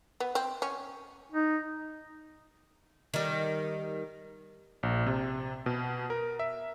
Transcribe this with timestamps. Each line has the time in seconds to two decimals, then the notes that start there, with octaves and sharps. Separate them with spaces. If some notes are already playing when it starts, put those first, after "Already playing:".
0.20 B3
0.35 C4
0.62 C#4
1.32 D#4
3.14 D#3 G3
4.83 A#1
5.06 C3
5.66 B2
6.10 A#4
6.39 E5